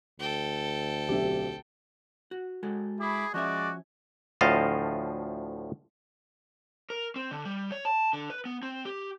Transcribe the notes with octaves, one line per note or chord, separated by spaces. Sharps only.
D2 A4 G5
B1 C4 G4 E5
F#4
G#3 F#4 A4
E4 G#4 B5 D6
F3 G#3 C#4 F#4 D5 E5
D2 A2 F3 D#5 F5 A5
A#4
C4
D3
G3
C#5
A5
D3
B4
B3
C4
G4